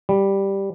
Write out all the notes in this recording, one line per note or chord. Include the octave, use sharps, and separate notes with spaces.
G3